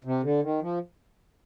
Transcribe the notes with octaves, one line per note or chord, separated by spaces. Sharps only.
C3
D3
D#3
F3